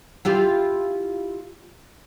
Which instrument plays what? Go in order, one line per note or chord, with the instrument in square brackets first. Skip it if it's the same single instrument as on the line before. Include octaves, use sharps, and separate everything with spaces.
[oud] E4 F4 G4